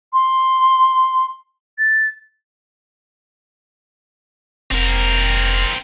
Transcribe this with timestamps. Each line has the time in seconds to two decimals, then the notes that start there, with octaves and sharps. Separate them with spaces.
0.13 C6
1.78 A6
4.72 F1 C4 A#4